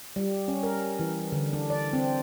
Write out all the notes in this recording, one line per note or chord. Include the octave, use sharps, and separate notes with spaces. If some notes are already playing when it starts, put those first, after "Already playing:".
G3
C#4
A#4
E3
D3
D4
D5
C4